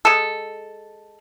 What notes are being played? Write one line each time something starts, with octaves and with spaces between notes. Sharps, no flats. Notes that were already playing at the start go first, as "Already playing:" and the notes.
G#3 A4